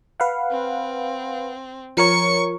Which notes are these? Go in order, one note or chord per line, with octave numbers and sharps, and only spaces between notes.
B4 F5 F#5
C4
F3 A#4 C#5 C#6 C#7